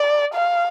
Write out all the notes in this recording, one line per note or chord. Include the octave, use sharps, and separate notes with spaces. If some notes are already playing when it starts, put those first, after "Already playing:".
Already playing: D5
F5